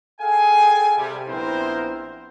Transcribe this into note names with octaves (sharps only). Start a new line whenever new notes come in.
G#4 A4 F5 G5 G#5
C3 G3
A#1 B3 C4 E4 A#4 C5